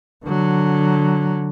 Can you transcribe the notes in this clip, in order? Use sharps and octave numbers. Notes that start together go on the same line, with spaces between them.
D3 F#3